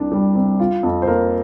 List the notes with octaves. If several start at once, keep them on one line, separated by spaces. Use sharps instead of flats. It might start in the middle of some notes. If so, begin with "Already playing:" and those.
Already playing: C2 D4
G3
C3
F4
F2
C5
A#3 A#4